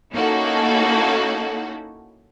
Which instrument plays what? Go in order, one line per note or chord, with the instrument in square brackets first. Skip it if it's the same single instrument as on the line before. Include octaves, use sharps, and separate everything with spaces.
[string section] A#3 C#4 D#4 E4 F#4 A4